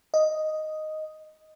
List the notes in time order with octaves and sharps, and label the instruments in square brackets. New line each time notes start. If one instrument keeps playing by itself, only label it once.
[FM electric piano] D#5